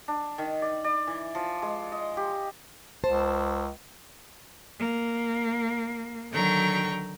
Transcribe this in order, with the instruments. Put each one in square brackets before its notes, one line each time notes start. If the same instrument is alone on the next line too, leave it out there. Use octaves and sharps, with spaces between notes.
[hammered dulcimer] D4
D#3
D5
D5
E3
F3
G#3
D#5
G4
[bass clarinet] C#2 [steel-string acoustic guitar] C5 A5
[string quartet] A#3
D3 D#3 F#3 G5 A#5 C#6